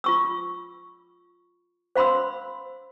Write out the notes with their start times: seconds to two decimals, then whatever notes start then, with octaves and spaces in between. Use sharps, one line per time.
0.04 F4 C#6 E6
1.96 C5 F5 B5 C6 E6